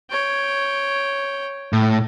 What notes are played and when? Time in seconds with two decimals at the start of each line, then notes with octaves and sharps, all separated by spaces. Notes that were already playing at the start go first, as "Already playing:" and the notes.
0.10 C#5 G5
1.73 A2